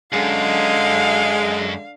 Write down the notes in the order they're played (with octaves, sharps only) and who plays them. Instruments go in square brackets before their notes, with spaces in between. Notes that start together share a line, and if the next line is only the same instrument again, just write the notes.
[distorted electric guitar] F#2 [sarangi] D3 [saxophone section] G#3 [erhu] F5